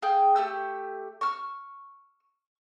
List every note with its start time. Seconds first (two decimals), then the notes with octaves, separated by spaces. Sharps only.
0.02 G#4 F5 G5 G6
0.36 A3 G4 E6
1.21 C#6 E6 F6